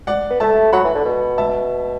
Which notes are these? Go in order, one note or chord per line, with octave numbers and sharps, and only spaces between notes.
D5 F#5
B3
A3 E5 A5
F#3 F#5 B5
E3
D3
B2
E5 A5